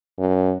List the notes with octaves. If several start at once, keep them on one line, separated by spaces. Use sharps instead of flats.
F#2